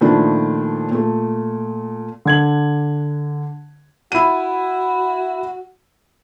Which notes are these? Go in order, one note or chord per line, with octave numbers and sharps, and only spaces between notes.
A#2 D#3 F3 A3 D4 E4
A#2 A3
D3 G#6 F#7
E4 F#4 D#7